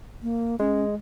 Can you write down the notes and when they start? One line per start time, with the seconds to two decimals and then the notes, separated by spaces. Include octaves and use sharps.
0.22 A#3
0.60 G#3 C#4